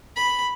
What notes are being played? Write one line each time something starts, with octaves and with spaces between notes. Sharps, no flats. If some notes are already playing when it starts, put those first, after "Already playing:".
B5